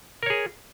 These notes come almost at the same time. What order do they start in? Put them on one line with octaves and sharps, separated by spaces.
A#4 C#5 G#4